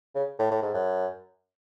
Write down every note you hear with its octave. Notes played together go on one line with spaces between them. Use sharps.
C#3
A2
A2
G#2
F#2